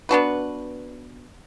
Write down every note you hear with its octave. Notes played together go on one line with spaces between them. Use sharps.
B3 D4 F#4 B4